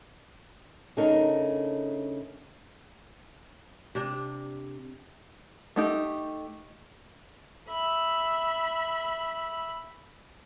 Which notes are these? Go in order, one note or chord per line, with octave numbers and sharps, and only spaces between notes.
C#3 A3 D4 D#4 A#4
C3 D4
A3 D#4 G4
E5 B5